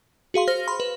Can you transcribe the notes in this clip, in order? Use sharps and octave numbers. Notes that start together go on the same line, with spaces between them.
F#4 G#4 F5 C6
C5 F6 A#6
B5 C6
B4